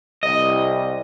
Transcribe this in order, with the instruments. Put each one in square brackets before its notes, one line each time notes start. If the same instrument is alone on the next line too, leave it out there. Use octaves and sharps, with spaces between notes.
[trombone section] C2 [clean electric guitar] D#5